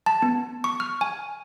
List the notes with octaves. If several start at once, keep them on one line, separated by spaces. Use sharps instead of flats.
A5
B3
C#6
F6
G#5